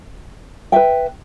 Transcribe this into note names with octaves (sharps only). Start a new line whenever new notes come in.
B4 E5 G5